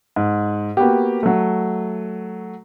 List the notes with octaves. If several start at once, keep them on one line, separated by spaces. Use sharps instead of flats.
G#2
A#3 B3 F#4 G4
F#3 A3